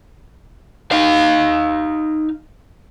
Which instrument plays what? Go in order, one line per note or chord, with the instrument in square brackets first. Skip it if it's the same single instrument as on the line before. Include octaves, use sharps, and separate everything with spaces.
[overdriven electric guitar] D#4 F5